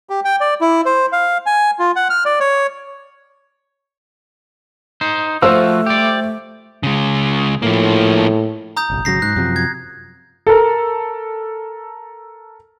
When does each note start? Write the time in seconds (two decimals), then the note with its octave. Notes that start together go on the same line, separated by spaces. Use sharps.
0.10 G4
0.25 G5
0.41 D5
0.61 E4
0.86 C5
1.13 F5
1.46 G#5
1.79 F4
1.96 F#5
2.10 F6
2.25 D5
2.40 C#5
5.01 D#4 C5
5.42 F3 A3 F4 F#4 C5 E6
5.86 G4 D5
6.83 C#3 G#3
7.62 A2 F3 A#3
8.77 A#5 D#6 G6
8.90 F#1 B1
9.05 G#1 C#3 F#3 A#6 C7
9.22 G#2 F#6
9.36 F#2 C3 F3
9.56 G#6
10.47 A4 A#4